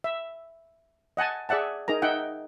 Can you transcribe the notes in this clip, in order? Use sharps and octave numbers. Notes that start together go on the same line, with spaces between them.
E5
D#5 F#5 G#5 A5
G#4 D5 E5 F#5 A5
D#4 G#4 A#4 A#5
D#4 E5 F#5 G5